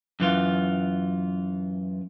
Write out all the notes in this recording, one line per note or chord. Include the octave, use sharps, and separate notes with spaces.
F#2 E3 F4